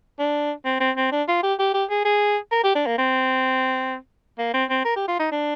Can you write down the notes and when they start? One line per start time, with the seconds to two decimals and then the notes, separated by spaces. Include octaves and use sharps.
0.19 D4
0.65 C4
0.80 C4
0.97 C4
1.12 D4
1.28 F4
1.43 G4
1.59 G4
1.74 G4
1.90 G#4
2.05 G#4
2.52 A#4
2.64 G4
2.75 D4
2.86 A#3
2.98 C4
4.38 A#3
4.54 C4
4.70 C4
4.85 A#4
4.96 G4
5.08 F4
5.20 D#4
5.32 D4